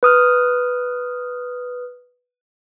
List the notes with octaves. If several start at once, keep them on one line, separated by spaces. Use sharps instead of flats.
B4 D#6 F6